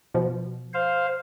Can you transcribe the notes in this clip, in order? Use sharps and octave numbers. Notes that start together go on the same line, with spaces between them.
B2 F3
C5 F5